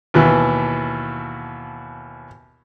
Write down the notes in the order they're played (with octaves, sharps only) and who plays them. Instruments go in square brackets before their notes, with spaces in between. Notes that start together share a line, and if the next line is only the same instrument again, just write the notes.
[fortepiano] D#2 B2 E3